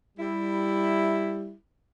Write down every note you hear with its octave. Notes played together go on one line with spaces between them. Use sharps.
G3 E4